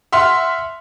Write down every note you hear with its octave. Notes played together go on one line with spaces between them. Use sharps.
E5 F#5 C6 F6